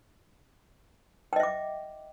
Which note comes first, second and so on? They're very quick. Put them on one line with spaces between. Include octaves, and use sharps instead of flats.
G5 D#5 E5 D6